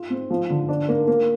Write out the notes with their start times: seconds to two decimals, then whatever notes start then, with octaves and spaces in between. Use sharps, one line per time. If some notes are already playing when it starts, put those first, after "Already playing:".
Already playing: F4
0.10 C4
0.30 F3
0.50 D3
0.69 D4
0.89 A#3
1.07 A#3